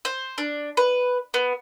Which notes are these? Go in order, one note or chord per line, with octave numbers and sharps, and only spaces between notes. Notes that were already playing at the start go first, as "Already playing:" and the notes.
C5
D4
B4
B3